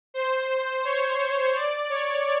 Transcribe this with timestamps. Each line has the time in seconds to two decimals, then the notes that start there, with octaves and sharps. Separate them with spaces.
0.14 C5
0.85 C#5
1.55 D5
1.90 C#5